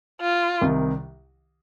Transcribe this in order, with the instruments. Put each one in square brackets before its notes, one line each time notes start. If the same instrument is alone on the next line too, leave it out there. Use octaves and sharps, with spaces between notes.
[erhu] F4
[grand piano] C2 C3 D#3